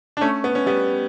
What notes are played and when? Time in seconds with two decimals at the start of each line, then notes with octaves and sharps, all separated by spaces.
0.17 D4
0.21 A3 C#4
0.44 B3
0.55 C#4
0.66 G3 B3